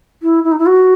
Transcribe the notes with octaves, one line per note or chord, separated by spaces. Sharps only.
E4
E4
D#4
E4
F#4